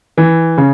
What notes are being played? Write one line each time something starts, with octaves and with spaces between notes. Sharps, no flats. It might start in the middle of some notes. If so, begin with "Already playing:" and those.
E3
C#3